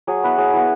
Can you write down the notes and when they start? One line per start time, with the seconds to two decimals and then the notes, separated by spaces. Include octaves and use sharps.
0.07 F#3 G#4
0.24 B3 E4 B4
0.38 F#3 G#4
0.53 B3 E4